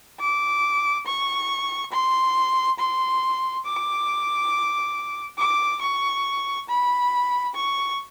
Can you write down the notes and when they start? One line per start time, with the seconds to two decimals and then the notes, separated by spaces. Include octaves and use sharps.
0.20 D6
1.07 C#6
1.92 C6
2.79 C6
3.65 D6
5.38 D6
5.82 C#6
6.69 B5
7.55 C#6